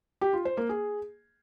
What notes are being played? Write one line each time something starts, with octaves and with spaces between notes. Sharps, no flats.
G4
F4
C5
A#3
G#4